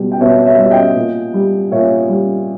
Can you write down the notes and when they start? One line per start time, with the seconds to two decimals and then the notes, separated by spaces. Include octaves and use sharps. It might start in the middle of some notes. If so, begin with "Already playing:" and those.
Already playing: B2 G3
0.12 G5
0.21 B2 C#5 E5
0.46 C#5 E5
0.58 G3 E5
0.71 D#5 G5
0.96 A#2
1.34 G3
1.71 A#2 C#5 E5
2.09 G3